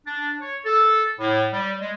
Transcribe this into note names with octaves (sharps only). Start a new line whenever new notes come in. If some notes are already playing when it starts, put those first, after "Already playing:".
D4
C#5
A4
A2
G3
G#3